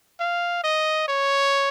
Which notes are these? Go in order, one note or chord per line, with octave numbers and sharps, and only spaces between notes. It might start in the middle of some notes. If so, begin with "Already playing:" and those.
F5
D#5
C#5